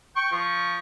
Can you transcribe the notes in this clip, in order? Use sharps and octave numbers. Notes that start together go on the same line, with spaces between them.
G5 C#6
F3 C#6